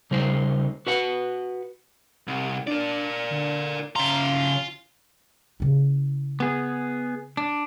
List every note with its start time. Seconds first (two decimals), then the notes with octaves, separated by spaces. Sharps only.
0.11 C#3 G3 D#4 C5
0.87 F#4 B4 F#5
2.28 C2
2.67 D4 A#4 D5
3.31 D3
3.96 C#3 F4 A#5
5.60 C#3 E4
6.40 B3 G#4
7.37 D4